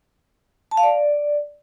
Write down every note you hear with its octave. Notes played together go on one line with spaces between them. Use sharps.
A5
F5
D5